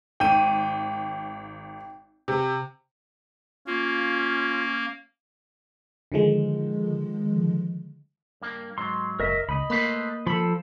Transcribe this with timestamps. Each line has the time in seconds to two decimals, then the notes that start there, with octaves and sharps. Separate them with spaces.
0.20 G#1 G5 D#7
2.28 C3
3.67 A#3 C#4 F4
6.12 D3 D#3 F3 G#3
8.42 G2 A#3
8.78 G#2 F#3 C6
9.20 F#1 A#4 D#5 E5
9.49 C#2 D#5 B5
9.70 A3 A#3 B4 C5
10.27 F3 A4 B5